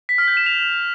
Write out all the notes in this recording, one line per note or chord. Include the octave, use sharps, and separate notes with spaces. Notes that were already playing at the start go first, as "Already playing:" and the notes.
B6
F6
G6
E7
F7